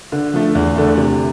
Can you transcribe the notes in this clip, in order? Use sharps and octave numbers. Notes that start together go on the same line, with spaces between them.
D3
F3 A3
E2
D3 A3
C3